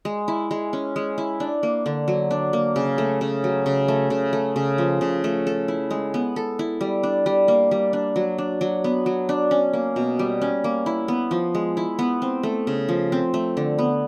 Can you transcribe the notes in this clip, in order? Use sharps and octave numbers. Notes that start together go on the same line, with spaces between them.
G#3
E4
G#3
C#4
G#3
E4
D4
A#3
D3
F#3
D4
A#3
C#3
A3
C#3
F#3
C#3
A3
C#3
A3
C#3
F3
C#3
A3
A4
E4
G#3
B3
A4
E4
G3
D4
G3
A#3
G3
D4
F#3
D4
F#3
B3
F#3
D4
C#4
A#3
B2
G3
C#4
A#3
E4
B3
F3
G#3
E4
B3
C4
A3
C#3
F3
C4
A3
D3
B3